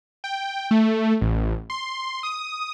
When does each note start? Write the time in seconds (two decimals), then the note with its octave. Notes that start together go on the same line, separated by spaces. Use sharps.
0.24 G5
0.71 A3
1.21 A1
1.70 C6
2.23 D#6